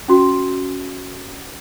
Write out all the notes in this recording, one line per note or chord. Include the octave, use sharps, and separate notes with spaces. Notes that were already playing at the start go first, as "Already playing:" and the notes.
C#4 F#4